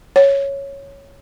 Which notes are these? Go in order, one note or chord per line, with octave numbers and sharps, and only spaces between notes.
C#5